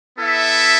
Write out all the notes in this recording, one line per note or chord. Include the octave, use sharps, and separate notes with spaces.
B3 E4 A4 E5